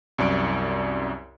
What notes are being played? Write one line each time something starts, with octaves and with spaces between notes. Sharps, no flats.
C2 F#2 D5 C#7 D7